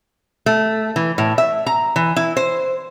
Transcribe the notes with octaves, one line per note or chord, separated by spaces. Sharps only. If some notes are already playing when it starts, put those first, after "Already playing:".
A3
E3
A2
E5
A#5
E3
E4
C5